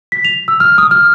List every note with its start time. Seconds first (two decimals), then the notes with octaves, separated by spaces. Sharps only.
0.12 B6
0.25 F7
0.48 E6
0.60 F6
0.78 D#6
0.91 F6